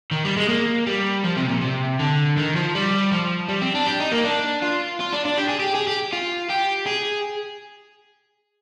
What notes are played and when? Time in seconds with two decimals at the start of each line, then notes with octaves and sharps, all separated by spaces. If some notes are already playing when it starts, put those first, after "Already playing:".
0.11 D#3
0.25 G3
0.37 G#3
0.49 A#3
0.87 G3
1.24 F3
1.37 C3
1.49 A#2
1.61 C3
1.99 D3
2.37 D#3
2.56 F3
2.75 G3
3.12 F3
3.49 G3
3.62 C4
3.75 D4
3.86 G4
4.00 D#4
4.12 A#3
4.24 D4
4.62 F4
5.00 F4
5.13 D4
5.25 D4
5.38 G4
5.49 G#4
5.60 G4
5.75 G#4
5.87 G4
6.13 F4
6.49 G4
6.87 G#4